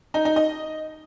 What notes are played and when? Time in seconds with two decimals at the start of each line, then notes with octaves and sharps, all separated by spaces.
0.14 D#4
0.25 D#4
0.36 D#5